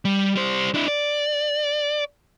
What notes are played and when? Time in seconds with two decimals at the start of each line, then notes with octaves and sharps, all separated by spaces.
0.05 G3
0.35 G3 C5
0.75 D4 E4
0.88 D5